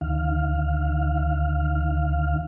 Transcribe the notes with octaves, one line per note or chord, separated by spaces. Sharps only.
D2 D#3 F5